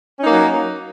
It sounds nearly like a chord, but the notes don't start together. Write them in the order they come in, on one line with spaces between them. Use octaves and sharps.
C#4 D#4 A#3 F#3